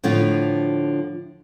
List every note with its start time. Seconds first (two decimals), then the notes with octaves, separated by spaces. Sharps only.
0.04 A2 D3 F3 D4 F4